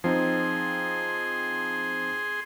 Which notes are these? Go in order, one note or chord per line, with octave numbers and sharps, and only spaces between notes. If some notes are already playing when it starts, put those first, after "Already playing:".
F3 C4 D#4 G#4 C6